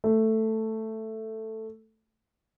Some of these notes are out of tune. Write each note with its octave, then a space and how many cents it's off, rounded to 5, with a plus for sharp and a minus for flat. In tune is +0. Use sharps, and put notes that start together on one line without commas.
A3 +5